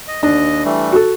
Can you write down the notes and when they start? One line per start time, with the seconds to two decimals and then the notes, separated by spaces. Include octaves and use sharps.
0.08 D#5
0.23 D#2 D4 D#5
0.65 E3 G3 A3
0.92 F#4 A4